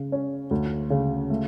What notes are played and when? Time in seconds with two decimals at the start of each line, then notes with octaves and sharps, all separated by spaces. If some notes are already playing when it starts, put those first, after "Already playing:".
Already playing: C#3
0.12 C#4
0.51 D2
0.90 C#3
1.30 A3